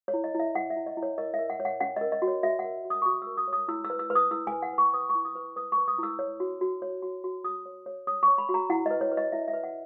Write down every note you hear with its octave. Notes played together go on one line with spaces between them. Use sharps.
C#5
E4
D#5
E4
E5
E4 F#5
E5
E4
D#5
E4
C#5
A#4 D#5
E5
A#4
F#5
C#5
F#5
C#4 F#5
A#4 D#5
D#5
F#4
C#5
F#4 E5
F#5
A#4
F#4
D#6
C#6
F#4 D#6
A#4 E6
D#6
C#5
D#6
E4 E6
E6
B4
E6
B4
D#6
E4 E6
B4 G#5
F#5
B4 C#6
B4 D#6
C#6
E4
D#6
B4
B4 D#6
C#6
B4
D#6
E4 E6
C#5
F#4
F#4
C#5
F#4
F#4
F#4 D#6
C#5
C#5
C#5 D#6
C#6
C#5
B5
F#4
A#5
E4 F#5
B4 D#5
C#5
B4
D#5
E4 E5
E5
B4
F#5